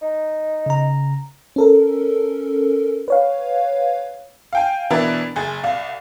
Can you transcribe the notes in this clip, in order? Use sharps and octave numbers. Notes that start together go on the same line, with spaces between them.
D#4
C#3 A#5
C#4 A4 A#4
B4 C#5 F5
F5 G5 G#5
B2 E3 D4 E4 A#4 A6
F#1 G#4 A6
C2 F5